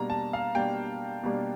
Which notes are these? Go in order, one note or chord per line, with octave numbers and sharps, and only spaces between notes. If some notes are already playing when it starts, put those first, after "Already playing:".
Already playing: B2 G3 A#3 D4 A#5
A5
F5
B2 G3 A#3 D4 G5
B2 G3 A#3 D4